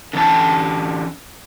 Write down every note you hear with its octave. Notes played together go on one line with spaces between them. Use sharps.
D3 E3 C#4 A5